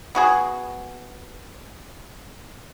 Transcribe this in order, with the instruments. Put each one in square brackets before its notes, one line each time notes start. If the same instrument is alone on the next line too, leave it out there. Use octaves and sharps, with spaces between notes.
[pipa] B3 F#4 G#4